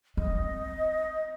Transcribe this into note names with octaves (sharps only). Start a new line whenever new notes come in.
C4 D#5